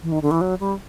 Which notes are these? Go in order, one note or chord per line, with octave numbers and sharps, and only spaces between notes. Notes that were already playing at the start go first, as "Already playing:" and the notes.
E3
D#3
D3
E3
F#3
G3